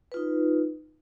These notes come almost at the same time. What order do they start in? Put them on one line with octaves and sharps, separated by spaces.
B4 F4 D#4